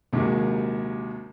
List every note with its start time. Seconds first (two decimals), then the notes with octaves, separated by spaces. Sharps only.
0.13 A#1 D#2 C3 F#3 G#3